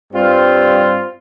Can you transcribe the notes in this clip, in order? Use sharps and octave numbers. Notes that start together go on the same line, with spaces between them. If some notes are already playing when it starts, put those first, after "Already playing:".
G2 G3 C4 F4